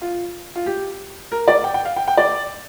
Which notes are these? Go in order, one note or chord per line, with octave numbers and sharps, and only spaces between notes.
F4
F4
G4
A#4
D5
G5
G5
F5
G5
G5
D5